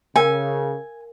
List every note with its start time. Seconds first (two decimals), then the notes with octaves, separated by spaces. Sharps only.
0.16 C#3 A#4 F5 G5 G#5